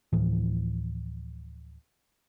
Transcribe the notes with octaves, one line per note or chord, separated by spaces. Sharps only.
D2 A2 E3 F3